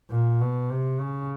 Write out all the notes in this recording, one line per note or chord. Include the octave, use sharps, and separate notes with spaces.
A#2
B2
C3
C#3